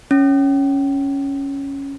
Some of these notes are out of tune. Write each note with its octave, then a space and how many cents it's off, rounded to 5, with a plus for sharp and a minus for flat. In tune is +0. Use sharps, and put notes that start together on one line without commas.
C#4 +0